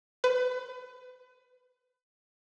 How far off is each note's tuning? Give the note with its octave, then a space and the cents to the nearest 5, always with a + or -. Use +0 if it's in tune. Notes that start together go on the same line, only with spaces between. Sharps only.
B4 +30